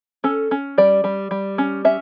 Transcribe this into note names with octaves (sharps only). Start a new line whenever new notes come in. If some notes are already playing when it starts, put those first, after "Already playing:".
C#4 A4
C#4
G3 D5
G3
G3
C#4
C#4 E5